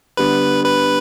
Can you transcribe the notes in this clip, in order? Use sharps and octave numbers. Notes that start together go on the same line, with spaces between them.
D3 G3 B3 B4
B4